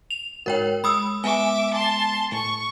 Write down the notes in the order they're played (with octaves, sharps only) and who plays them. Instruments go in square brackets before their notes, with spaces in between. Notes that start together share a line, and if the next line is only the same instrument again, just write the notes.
[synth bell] F7
[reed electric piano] G#2 F#4 [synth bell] A#4 C#5 G5
[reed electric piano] G#3 [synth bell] B5 D#6 E6
[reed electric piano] G#3 B3 [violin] E5 D6 [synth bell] G#5
[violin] A5 C6
[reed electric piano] A2 [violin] C#6